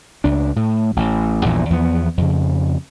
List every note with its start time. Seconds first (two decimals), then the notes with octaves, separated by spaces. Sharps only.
0.24 C#2 D4
0.56 A2
0.96 A1
1.45 A#1 E2 G2 A#2
1.70 E2 F3 B3
2.17 F2 C#3